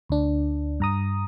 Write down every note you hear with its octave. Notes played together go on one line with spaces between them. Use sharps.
D2 D4
G2 A#5 D#6